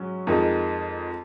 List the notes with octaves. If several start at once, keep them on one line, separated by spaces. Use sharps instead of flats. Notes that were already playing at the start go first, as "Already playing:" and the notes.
Already playing: G#2 F#3 C#4 F#4
F2 D#3 G#3 D#4